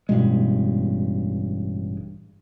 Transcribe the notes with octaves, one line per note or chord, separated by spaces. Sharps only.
A1 G2 B2 G#3